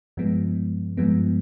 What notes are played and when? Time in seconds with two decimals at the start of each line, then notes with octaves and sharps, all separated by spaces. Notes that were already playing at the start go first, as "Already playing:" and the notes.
0.17 G2 F3 G#3 B3
0.97 G2 F3 G#3 B3